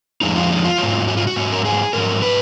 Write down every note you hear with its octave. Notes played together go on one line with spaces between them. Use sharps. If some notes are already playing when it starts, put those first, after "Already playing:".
F2 F3 G#3 D#4
F4
D#4
F4
G#2 F#3
F#4
F4
F#4
G#2 F#3
A#4
G#4
G#2 F#3 A#4
B4